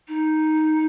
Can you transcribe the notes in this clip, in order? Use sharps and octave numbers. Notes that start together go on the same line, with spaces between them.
D#4